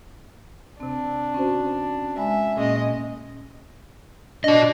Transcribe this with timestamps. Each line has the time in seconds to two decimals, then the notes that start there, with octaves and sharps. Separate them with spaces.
0.80 C3 C4 D4
1.34 C#4 F#4 C5
2.17 G#3 E5 G#5 B5
2.57 A#2 G#3 A#3 C#4 D#5
4.44 D4 F#4 D#5